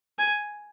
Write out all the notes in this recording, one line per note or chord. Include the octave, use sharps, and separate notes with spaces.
G#5